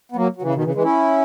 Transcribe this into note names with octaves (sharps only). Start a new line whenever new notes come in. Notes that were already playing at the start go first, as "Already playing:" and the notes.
B3
F#3 A#3
F#3
C#3 E3
B2 D#3
C#3 E3
E3 G#3
C#4 E4